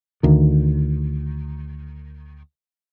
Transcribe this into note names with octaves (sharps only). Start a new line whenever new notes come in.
D2 D#3